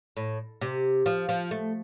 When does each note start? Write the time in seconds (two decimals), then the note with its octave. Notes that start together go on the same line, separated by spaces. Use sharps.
0.17 A2
0.61 C3
1.06 F3
1.29 F3
1.51 A3